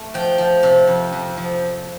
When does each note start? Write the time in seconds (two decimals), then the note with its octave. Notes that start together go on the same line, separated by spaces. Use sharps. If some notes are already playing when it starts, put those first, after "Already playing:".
Already playing: A3
0.14 F3 G5
0.38 F3
0.63 C3
0.87 F2
1.12 F2
1.37 F3